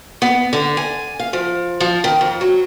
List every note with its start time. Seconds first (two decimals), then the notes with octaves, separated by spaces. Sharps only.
0.22 B3
0.53 D3
0.77 G#5
1.19 F5
1.33 F3
1.80 F3
2.04 D#3
2.21 F2
2.41 F#3